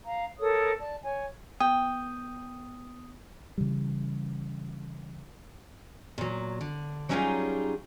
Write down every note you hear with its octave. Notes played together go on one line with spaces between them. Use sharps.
F5 A#5
A4 A#4 C#5 D#6
D5 A5
C#5 G#5
B3 G5 D#6
C#3 E3 G3
A#2 F#3
D3
F#3 G3 C#4 D#4 F4 G#4